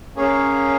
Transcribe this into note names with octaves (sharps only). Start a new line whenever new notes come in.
A#3 C#4 G#4 C#5 F5